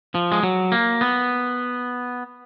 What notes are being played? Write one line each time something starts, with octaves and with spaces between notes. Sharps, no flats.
F3
G#3
F#3
A#3
B3